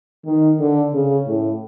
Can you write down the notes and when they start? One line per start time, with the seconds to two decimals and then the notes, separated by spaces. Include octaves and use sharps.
0.25 D#3
0.59 D3
0.93 C#3
1.27 A2